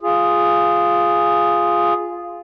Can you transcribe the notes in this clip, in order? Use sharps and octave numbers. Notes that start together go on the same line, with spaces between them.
F4 G#4